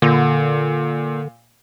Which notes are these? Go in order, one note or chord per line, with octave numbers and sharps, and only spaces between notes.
A#2 D3